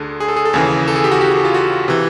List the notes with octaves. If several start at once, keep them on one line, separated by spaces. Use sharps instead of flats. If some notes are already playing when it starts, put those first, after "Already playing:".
Already playing: D2 D3 G#4 A4
G#4
A4
G#4
A4
D#2 C#3 E3 G#4
A4
G#4
G4
F#4
G4
G#4
A4
F4
F#4
C3 E3